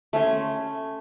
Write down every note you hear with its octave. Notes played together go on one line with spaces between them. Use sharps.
A3 C#4 G#5 C6